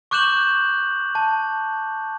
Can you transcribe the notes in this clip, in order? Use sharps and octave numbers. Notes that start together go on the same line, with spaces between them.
C#6 D6 F#6 G6 E7 F#7
A5